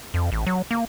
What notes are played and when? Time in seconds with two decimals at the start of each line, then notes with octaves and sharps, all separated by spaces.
0.14 F2
0.32 A1
0.46 F#3
0.71 A#3